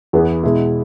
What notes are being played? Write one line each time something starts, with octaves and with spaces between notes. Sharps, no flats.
E2 E3 B3 E4 G#4
B2 G#3 E4